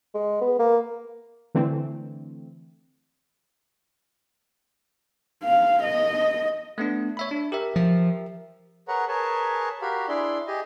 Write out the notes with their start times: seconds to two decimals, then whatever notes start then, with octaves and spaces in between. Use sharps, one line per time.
0.14 G#3
0.41 B3
0.59 A#3
1.54 D3 E3 A3 C4
5.43 F5
5.83 D#5
6.78 A3 B3 D4
7.17 C#5 E5 B5
7.31 D4
7.52 G4 A#4 E5
7.76 F3
8.88 G#4 A#4 B4 C#5 F#5 A#5
9.08 G#4 A#4 B4 C#5 G#5 A5
9.82 F#4 G4 A#4 F5 B5
10.08 D4 E4 G#4 D5 C6
10.47 G4 G#4 D#5